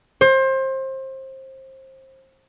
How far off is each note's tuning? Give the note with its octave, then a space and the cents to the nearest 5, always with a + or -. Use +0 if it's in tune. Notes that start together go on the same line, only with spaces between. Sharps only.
C5 +25